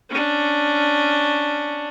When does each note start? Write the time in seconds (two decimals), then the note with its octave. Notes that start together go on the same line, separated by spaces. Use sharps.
0.10 C#4 D4